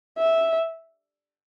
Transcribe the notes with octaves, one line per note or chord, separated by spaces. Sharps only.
E5